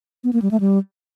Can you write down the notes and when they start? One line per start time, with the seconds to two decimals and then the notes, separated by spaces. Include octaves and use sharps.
0.24 B3
0.33 A#3
0.42 G3
0.51 A3
0.60 G3